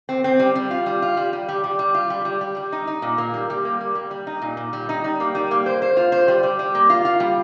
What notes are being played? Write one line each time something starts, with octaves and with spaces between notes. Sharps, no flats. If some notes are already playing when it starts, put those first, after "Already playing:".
C4
C4
G3
G3
F4
G3
F4
G3
G3
G3
G3
G3
F4
G3
G3
G3
G3
D#4
D#4
A#2
A#3
G3
G3
A#3
G3
G3
G3
D#4
A#2
A#2
G3
D#4
G3
A#3
G3
A#3
C5
C5
F4
C5
G3
G3
G3
A#3
F4
F4
G3